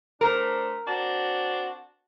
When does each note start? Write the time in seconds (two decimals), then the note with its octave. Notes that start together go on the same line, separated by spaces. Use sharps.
0.21 A3 C4 D4 A#4
0.86 C4 D4 F#4